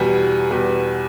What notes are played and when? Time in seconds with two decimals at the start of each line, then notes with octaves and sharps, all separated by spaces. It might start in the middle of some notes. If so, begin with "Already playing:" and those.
Already playing: E2 B2 G3
0.51 E2 B2 G3